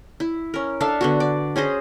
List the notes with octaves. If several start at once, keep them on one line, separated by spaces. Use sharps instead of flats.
E4
C#4 A#4
D4 A4 E5 F5
D3 B3 F#4
D5
C#4 G#4 C5 D#5